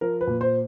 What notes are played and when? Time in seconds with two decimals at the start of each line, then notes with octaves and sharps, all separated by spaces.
0.01 F3 A#4
0.21 B4
0.27 A#2
0.41 C5